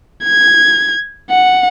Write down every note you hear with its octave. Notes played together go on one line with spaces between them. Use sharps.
G#6
F#5